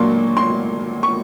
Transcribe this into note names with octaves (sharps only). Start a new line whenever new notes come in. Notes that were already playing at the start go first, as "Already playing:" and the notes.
Already playing: A#2 F#3 A#3 D4 C6 C#6
C6
C#6